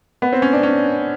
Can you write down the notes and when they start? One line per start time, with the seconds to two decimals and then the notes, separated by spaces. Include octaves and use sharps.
0.22 B3
0.32 C4
0.42 C#4
0.53 D4
0.63 C#4